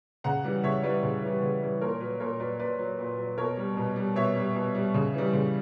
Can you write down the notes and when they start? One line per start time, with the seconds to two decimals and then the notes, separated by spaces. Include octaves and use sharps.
0.24 C#3 F#5 A#5
0.44 E3 G3
0.64 C#3 C#5 E5
0.83 E3 G3 B4 D5
1.03 C#3
1.23 E3 G3
1.42 C#3
1.62 E3 G3
1.81 A#2 A#4 C#5
2.01 F#3 B4
2.20 A#2 A#4 C#5
2.40 F#3 B4 D5
2.59 A#2 B4 D5
2.79 F#3
2.99 A#2
3.18 F#3
3.37 B2 A#4 C#5
3.57 G3
3.77 B2
3.96 G3
4.16 B2 C#5 E5
4.35 G3
4.55 B2
4.75 G3
4.94 C#3
5.14 E3 G3
5.33 C#3